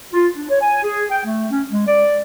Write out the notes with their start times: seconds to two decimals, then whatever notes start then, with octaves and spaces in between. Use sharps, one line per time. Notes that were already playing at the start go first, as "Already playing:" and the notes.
0.13 F4
0.36 D4
0.50 C#5
0.62 G#5
0.84 G#4
1.11 G5
1.25 A3
1.51 C#4
1.70 G#3
1.87 D5